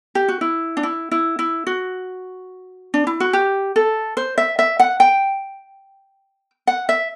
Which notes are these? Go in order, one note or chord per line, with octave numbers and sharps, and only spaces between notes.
G4
F#4
E4
D4
E4
E4
E4
F#4
D4
E4
F#4
G4
A4
C5
E5
E5
F#5
G5
F#5
E5